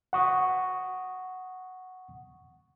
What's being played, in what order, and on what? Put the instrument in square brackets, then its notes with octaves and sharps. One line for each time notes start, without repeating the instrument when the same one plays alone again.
[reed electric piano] F#5 C#6 D#6